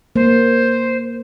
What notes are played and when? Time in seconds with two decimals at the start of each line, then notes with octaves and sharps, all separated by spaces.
0.16 A#3 C5